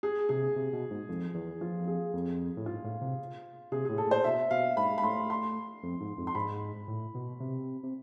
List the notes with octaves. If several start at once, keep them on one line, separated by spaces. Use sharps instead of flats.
G#4
C3 G#4
C3
B2
G#2
F2
E2
F2 F4
G#4
F2
A2
G#2 F4
A2
C3
C3 G#4
A2 G#4
A4
A2 C5
B2 E5
B2 F5
G#2 B5
B5
A2 C6
C6
F2
G#2
F2
C6
G#2 B5
A2
B2
C3
C3